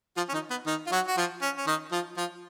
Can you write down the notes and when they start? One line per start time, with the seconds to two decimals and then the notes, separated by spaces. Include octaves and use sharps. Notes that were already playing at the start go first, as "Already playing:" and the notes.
0.17 F3 F4
0.29 C#4
0.33 D#3 D#4
0.50 B3
0.67 D#3 D#4
0.86 F4
0.92 F#3 F#4
1.07 F#4
1.17 F3 F4
1.42 C#4
1.57 C#4
1.67 D#3 D#4
1.92 F3 F4
2.17 F3 F4